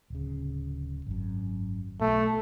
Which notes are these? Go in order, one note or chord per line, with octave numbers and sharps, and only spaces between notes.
D1 C#3
G#1 F#2
B1 B2 A3